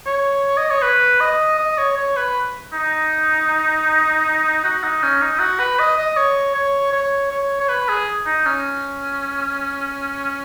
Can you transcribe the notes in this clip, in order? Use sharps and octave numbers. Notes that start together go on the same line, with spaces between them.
C#5
D#5
C#5
B4
D#5
D#5
C#5
C#5
B4
D#4
F#4
D#4
C#4
D#4
F#4
B4
D#5
D#5
C#5
C#5
C#5
C#5
C#5
B4
G#4
D#4
C#4